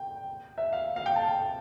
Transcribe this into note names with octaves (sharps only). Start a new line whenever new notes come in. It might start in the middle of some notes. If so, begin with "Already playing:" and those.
Already playing: G5
E5
F5
F5
G5
A5